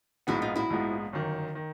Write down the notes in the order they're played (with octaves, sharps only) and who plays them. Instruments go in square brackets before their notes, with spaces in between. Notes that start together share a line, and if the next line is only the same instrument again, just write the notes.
[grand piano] A#1 G#2 F3 G#3 B3 [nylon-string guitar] E4 F#4
[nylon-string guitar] D#4 F4
E4 F#4
[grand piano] A#1 G#2 F3 G#3 B3
G1 F#2 D#3
D#3